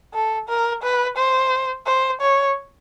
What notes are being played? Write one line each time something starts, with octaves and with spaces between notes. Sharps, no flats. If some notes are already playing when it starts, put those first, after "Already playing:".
A4
A#4
B4
C5
C5
C#5